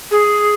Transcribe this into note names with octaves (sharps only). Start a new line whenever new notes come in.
G#4